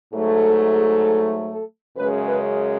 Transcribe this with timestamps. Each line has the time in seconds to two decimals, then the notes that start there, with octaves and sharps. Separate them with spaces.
0.13 G#2 F#3 A3
0.44 A4
0.75 G#4
1.51 A4
1.97 F#2 C#3 G#3 B4
2.27 B4